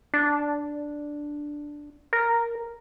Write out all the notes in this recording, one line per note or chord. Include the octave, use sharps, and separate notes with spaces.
D4
A#4